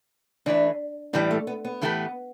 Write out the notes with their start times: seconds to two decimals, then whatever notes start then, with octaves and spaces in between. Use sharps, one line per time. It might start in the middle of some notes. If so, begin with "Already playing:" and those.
0.46 E3 A3 D4 E4 B4
1.13 A2 E3 G3 D4
1.31 A3
1.47 B3
1.65 B3
1.81 A2 E3 A3 G4 B4